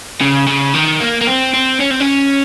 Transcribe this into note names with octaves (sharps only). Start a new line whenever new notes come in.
C#3
C#3
D#3
A#3
A#3
C4
C4
C#4
C4
C#4